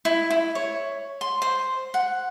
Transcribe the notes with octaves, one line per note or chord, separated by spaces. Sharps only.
E4
E4
C#5
C6
C5
F#5